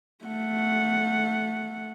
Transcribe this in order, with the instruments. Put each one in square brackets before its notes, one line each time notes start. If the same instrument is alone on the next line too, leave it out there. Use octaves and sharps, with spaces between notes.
[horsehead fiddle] A3 F#5